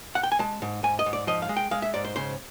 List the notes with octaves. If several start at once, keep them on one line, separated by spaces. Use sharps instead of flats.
F#5
G5
G#5
G#3 A5
G#2
G#2 G#5
D#5
G#2
D5
F3 D#5
F5
G#3
G5
G#3 F5
E5
G#2 D5
C5
C#3 C5